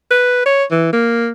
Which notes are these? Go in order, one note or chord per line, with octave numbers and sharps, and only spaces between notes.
B4
C#5
E3
A#3